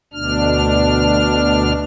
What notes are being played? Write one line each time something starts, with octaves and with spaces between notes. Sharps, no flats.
D2 B2 D4 F6